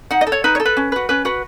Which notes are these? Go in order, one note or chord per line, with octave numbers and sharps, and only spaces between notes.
D#4 F#5
D#5
A4
C#5
D#4 B4
C#5
A4
B4
C#4
F#4 B4
C#4 B4
F#4 B4